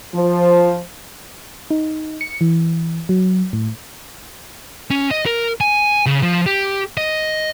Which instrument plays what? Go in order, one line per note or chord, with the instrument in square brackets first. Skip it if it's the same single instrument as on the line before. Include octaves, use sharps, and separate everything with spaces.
[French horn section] F3
[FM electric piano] D#4
C#7
E3
F#3
A2
[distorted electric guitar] C#4
D#5
A#4
G#5
C#3
F3
G4
D#5